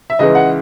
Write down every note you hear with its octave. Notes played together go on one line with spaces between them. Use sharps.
E5
C#2 C#3 E3 G#3 D#5
F#5